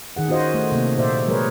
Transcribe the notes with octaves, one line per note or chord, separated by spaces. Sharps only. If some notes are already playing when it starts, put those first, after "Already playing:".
D#3 G#4 F#5
C#4 F4 F#4 C5 D#5
A3
C3 A#3
A#2 C5 D5 E5
F#3 G#3 G#4 A#4 B4 C#5